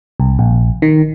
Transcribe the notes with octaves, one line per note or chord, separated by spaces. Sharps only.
C2
A#1
D#3